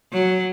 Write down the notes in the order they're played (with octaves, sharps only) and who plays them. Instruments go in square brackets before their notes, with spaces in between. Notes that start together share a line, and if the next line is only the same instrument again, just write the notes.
[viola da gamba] F#3